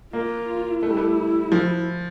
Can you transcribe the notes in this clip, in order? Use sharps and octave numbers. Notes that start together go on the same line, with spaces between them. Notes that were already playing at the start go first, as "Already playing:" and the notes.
A#3 F4
A3 E4
G3
A3
F3